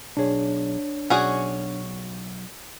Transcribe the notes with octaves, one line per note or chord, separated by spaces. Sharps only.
B1 D4 G#4 C#5
B1 C#4 F#4 G#4 D5 G#5